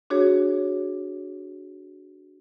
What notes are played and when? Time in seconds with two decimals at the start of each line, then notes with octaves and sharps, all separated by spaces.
0.10 D4 F#4 G#4 C#5